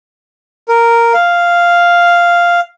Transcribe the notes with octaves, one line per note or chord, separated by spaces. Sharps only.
A#4
F5